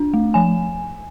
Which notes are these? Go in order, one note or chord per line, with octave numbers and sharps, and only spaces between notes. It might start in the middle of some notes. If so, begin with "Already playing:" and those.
Already playing: D4
A3
F3 G#5